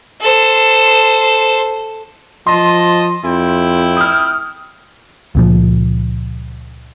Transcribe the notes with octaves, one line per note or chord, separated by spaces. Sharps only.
A4 C5
F3 D#5 A5 C6
F2 E4 G5
D#6 F6
C#2 A#2 F3